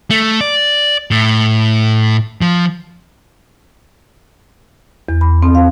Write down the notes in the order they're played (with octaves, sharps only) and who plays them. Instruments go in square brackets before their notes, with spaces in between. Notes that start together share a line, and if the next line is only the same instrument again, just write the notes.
[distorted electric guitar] A3
D5
A2
F3
[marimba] E2
B5
C4
F5